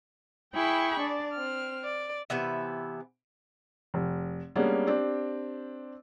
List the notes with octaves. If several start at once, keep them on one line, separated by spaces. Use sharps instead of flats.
E4 G#4 G5 B5 C#6
D4 D5
C4 F6
D5
C3 E3 B3 E5
F1
G3 G#3 A#3 B3 C#4 D4
C4 D4 G4